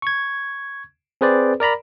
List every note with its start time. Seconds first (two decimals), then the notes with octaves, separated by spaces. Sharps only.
0.02 C#6 G#6
1.21 C4 G#4 B4 C5 D5
1.60 A#4 D5 A#5 B5